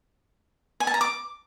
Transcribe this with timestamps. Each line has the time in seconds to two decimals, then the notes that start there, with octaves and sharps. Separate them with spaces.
0.80 G#5
0.87 A5
0.94 A#5
1.01 D6